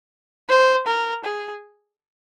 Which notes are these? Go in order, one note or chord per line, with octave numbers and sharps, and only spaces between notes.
C5
A#4
G#4